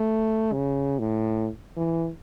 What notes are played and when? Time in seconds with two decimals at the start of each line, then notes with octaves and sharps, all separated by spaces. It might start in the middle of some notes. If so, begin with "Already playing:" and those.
Already playing: A3
0.53 C#3
0.99 A2
1.77 E3